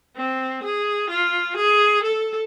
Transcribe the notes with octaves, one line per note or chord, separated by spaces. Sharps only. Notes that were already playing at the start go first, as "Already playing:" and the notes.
C4
G#4
F4
G#4
A4